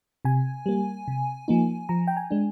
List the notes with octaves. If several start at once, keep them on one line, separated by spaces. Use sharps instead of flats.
C3 G#5
G3 A#3
C3
F3 A#3 D#4
F3 A#5
G5
G#5
G#3 D4